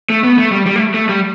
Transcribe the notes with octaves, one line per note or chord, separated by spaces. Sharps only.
A3
B3
A3
G3
G3
A3
A3
G3